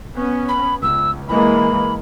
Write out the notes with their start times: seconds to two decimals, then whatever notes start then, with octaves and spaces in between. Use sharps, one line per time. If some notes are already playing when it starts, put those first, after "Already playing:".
0.14 B3 C#4
0.48 B5
0.82 C#2 E6
1.28 E3 G#3 A#3 B5